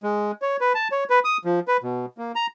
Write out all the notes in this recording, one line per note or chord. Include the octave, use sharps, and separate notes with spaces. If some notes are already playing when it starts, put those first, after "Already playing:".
G#3
C#5
B4
A5
C#5
B4
D#6
F3
B4
B2
A#3
A#5